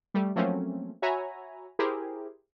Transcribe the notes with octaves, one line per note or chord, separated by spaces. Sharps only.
G3 A3
F3 F#3 A3 A#3 C4 C#4
F#4 C#5 E5 G#5 A#5 B5
E4 G4 G#4 A#4 C5